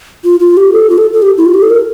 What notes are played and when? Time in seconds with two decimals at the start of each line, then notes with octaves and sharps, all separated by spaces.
0.25 F4
0.40 F4
0.57 G4
0.72 A4
0.90 F4
0.98 A4
1.13 A4
1.22 G4
1.38 E4
1.46 F4
1.54 G4
1.62 A4
1.70 A#4